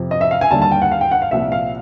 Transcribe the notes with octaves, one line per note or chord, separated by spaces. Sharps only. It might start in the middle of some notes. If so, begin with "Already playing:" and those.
Already playing: F2 C3 F3
D#5
E5
F5
G#5
D#2 D3 G3 A5
A5
G5
F#5
F5
G5
F#5
F5
C2 A#2 F3 E5
F5